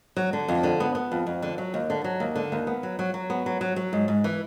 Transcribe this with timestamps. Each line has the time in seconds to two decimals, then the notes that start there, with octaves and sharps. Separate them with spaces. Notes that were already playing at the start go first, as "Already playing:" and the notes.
0.16 F#3
0.33 D3
0.48 F2
0.63 D3
0.80 B3
0.95 B3
1.12 F2
1.27 F2
1.42 D3
1.58 F#3
1.74 D#2
1.90 D3
2.04 F#3
2.20 D#2
2.36 D3
2.52 D#2
2.67 B3
2.83 F#3
2.99 F#3
3.14 F#3
3.30 B3
3.46 F#3
3.61 F#3
3.76 F#3
3.93 G#2
4.08 G#2
4.24 E3